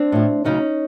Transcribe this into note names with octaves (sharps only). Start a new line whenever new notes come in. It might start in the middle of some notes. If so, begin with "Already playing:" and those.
Already playing: C4 D4
A2 F3
D2 C#3 F#3 C#4 D#4